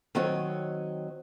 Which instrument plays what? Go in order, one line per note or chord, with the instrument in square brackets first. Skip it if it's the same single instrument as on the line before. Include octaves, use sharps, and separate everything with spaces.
[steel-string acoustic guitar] D#3 F#3 C4 C#5 D#5